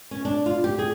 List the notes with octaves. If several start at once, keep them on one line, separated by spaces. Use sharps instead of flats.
C#4
D4
F4
G4
G#4